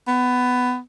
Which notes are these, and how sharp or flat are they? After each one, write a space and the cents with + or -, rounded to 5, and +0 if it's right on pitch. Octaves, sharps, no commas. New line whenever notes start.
B3 +15